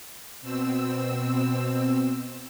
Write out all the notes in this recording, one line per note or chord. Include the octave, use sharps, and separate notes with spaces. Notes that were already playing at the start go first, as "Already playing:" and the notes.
B2 C4 E6